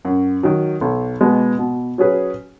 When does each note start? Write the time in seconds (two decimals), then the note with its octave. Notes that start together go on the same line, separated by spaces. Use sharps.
0.05 F#2
0.43 D#3 F#3
0.81 B1
1.21 B2 G#3 B3
1.59 B2
1.98 F#3 C#4 G#4 B4